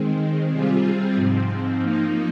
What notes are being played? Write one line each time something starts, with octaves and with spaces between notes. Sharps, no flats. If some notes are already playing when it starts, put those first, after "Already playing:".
Already playing: D#3 G#3 C4
C3 G3 C4 F4 G#4
G#2 F3 C4
F3 A#3 D#4